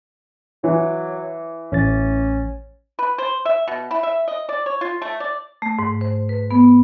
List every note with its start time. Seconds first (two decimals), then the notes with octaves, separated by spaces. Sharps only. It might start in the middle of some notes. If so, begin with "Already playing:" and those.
0.64 E3 F#3
1.72 A1 C#4 A6
2.99 B4
3.18 C5
3.45 E5
3.68 B2
3.91 E4
4.03 E5
4.28 D#5
4.49 D5
4.66 C#5
4.81 F4
5.02 A3
5.20 D5
5.62 A3
5.79 G#2
6.01 C5
6.29 B4
6.51 B3